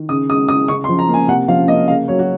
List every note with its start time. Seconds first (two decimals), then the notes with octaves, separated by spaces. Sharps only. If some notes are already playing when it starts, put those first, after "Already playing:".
Already playing: D#3
0.09 C#3 D#6
0.29 G#3 D#6
0.48 C#3 D#6
0.68 C#3 C#6
0.84 C6
0.89 F3
0.99 A#5
1.09 A#3
1.14 G#5
1.28 C3 F#5
1.48 F3 F5
1.68 A#3 D#5
1.88 C#3 F5
2.08 F#3 C#5
2.19 F#4